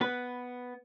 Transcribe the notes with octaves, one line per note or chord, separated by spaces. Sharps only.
B3 B4